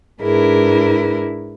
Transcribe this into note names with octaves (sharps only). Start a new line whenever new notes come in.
G#2 D4 E4 G#4 A#4 B4